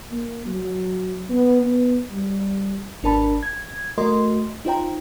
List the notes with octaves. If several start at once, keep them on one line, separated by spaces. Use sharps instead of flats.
A#3
F#3
B3
B3
G3
G#1 D4 A#4 A5 B5
G#6
A3 F#4 A#4 D#5 C6
D#4 F4 C5 G5 A#5